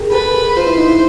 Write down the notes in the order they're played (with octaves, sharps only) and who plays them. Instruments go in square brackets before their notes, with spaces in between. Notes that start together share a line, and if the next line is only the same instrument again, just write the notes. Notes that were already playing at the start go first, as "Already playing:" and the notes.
Already playing: [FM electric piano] G4 G#4 A#4
[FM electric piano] G4 A4 [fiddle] B4
[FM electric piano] F4 [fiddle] C5
[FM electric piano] E4
D#4
E4